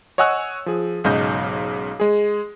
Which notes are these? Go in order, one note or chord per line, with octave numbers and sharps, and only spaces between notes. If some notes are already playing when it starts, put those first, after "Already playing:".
C#5 D#5 F#5 G#5 E6 F#6
F3 G#4
B1 G#2 C#3 D#5 G6
G#3 G#4